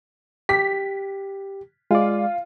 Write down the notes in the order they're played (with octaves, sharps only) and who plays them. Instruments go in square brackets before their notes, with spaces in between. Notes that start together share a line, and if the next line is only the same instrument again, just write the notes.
[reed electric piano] G4 [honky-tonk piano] B6
[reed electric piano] G#3 D5 [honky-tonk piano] F4